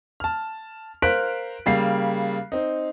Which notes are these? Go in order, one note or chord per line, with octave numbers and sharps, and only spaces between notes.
A5 F6
A#4 C5 F5 F#6 B6 D7
C#3 G3 A#3 C7
C4 D#4